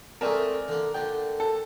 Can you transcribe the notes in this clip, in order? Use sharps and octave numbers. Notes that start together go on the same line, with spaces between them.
G#3 A3 C4 A#4 D5 E5 G#5
D3 A#3
A#2 D3 G5
A4